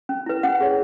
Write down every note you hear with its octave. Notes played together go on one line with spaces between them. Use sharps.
C#4
E4 B4
C#4 F#5
G#4 C#5